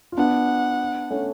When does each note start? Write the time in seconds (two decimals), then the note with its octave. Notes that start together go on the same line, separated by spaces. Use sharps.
0.12 F4
0.17 B3 D4 F#5
1.11 A3 C#4